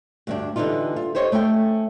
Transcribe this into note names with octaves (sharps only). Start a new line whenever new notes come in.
D2 G2 D4
D3 E3 G3 D#4 F4
F4
G4 C5 C#5 D#5
A3 C#4 E5 G5